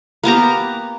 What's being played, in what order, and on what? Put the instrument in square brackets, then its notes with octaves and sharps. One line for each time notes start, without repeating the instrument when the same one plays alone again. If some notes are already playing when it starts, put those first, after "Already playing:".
[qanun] A#3 B3 G4 A#5